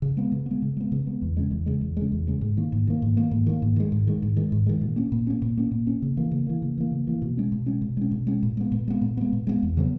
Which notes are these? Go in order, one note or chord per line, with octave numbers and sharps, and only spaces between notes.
C#3
G#3 B3
C#3
G#3 B3
C#3
G#3 B3
C#3
G#3 B3
E2
C#3 G#3
E2
C#3 G#3
E2
C#3 G#3
E2
C#3 G#3
G#2
D#3 A#3
G#2
D#3 A#3
G#2
D#3 A#3
G#2
D#3 A#3
G#2
D#3 G#3
G#2
D#3 G#3
G#2
D#3 G#3
G#2
D#3 G#3
A#2
A#3 C#4
A#2
A#3 C#4
A#2
A#3 C#4
A#2
A#3 C#4
C#3
E3 A#3
C#3
E3 A#3
C#3
E3 A#3
C#3
E3 A#3
B2
G#3 C#4
B2
G#3 C#4
B2
G#3 C#4
B2
G#3 C#4
A#2
G#3 B3
A#2
G#3 B3
A#2
G#3 B3
A#2
G#3 B3
E2
C#3 F#3 B3